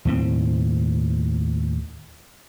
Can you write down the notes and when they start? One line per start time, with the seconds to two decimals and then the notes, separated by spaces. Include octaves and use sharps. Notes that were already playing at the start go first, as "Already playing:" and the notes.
0.05 D#2 A2 C4